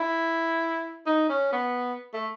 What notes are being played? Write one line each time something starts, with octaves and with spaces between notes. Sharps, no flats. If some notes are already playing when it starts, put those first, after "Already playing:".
Already playing: E4
D#4
C#4
B3
A3